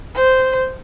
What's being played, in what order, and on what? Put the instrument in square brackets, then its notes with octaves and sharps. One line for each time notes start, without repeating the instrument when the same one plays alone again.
[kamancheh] C5